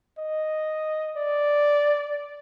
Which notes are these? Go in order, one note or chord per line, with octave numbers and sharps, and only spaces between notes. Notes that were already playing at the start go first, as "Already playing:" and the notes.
D#5
D5